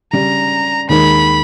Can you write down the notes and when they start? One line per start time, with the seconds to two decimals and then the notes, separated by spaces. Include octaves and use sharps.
0.12 C#3 G3 C#4 A#5
0.89 D#2 D#3 G#3 D#4 A#4 B5